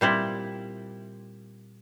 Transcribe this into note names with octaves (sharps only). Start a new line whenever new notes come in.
A#2 G3 C4 E4